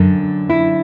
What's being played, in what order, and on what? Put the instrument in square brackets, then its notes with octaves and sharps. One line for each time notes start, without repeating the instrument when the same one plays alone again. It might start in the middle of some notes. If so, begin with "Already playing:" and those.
Already playing: [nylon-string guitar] F#2 D3
E4